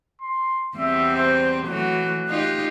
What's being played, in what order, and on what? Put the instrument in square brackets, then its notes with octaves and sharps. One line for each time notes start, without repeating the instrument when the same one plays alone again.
[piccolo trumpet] C6
[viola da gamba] E2 G3 C4 [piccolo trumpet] E5
[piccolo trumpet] C5
[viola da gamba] E3 F#3 A3 [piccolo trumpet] F#6
[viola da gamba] D#4 F4 G4